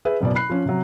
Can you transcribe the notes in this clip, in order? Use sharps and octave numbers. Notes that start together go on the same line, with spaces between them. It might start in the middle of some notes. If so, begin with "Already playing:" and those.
G#4 B4 E5
F#1 B2 D5
B5 F#6 C7
F3 C#4
C3 F#3